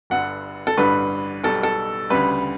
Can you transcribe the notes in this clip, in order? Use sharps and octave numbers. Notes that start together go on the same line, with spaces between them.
G1 G2 D3 F#5
A4
A1 G2 D3 G3 B4
B1 B2 G3 A4
A4
D2 C#3 G3 B4